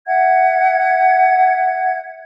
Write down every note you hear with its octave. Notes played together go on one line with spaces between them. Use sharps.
E5 F#5 G#6